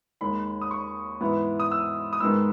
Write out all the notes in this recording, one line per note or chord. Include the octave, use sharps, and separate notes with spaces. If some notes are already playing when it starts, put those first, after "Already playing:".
D#2 D#3 G#3 D#4 B5
D#6
C#6
G#2 E3 B3 E4
D#6
E6
D#6
G#2 D#3 G#3 B3 E6